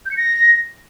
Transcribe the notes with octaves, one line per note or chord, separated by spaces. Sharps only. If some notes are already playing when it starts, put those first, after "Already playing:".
G6
C#7
A#6